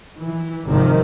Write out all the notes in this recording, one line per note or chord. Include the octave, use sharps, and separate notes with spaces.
E3
G#1 C3 D#3 F3